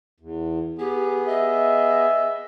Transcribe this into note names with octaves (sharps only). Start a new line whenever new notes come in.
E2
B3 G4 G#4
D#5 E5